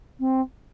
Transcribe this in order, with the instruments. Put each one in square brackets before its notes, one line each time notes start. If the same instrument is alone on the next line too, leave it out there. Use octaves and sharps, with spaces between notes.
[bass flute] C4